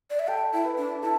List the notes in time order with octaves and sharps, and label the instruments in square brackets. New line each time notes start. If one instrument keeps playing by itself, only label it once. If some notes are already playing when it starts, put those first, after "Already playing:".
[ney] D5
E5
[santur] A4 [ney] G5
[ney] E4
[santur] B4
[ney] D4
[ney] E4 [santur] A4